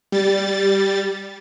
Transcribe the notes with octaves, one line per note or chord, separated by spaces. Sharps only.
G3 A6